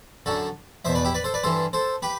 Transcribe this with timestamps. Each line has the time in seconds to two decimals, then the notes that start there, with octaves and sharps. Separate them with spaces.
0.26 F#2 D3 F#4 A4
0.85 E2 B2 C5 E5
0.95 B4 D5
1.04 E4 G4
1.14 B4 D5
1.24 A4 C5
1.34 B4 D5
1.43 G2 E3 A4 C5
1.73 A4 C5
2.02 G4 B4